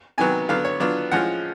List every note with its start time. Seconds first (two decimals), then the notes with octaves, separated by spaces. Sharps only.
0.18 C3 D#3 F#3 B3 G#5
0.49 D3 F#3 B3 F5
0.65 C#5
0.80 F#3 B3 D4 F4
1.12 A2 F3 G#3 C#4 F4 F#5